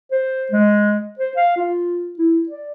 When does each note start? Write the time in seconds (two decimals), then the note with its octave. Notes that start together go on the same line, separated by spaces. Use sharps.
0.12 C5
0.52 G#3
1.19 C5
1.36 F5
1.57 F4
2.19 E4
2.49 D5